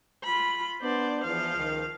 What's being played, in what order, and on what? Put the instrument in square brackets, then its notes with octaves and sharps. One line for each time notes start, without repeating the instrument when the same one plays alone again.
[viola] F4 B5
[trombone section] B3 D4 [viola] C5 D5
[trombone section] E2 [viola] F3 F5
[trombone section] C#2 D#3